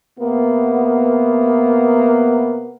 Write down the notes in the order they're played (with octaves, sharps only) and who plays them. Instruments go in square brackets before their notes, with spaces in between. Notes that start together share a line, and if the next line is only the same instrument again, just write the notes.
[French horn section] C3 A#3 B3